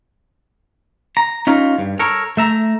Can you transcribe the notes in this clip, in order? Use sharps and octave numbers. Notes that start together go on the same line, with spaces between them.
A#5
C#4 D#4 F4 A#4
G2
A4 A#4 C#5
A3 E5 A#5